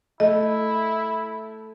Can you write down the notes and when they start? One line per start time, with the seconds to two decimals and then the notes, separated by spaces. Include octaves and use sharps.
0.20 A3 E4 D#5